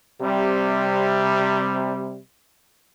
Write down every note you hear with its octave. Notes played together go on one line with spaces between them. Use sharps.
C3 G3